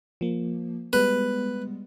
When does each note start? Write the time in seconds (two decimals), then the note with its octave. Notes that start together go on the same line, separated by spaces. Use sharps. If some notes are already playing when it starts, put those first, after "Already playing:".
0.21 F3 A#3
0.93 G3 G#3 B3 B4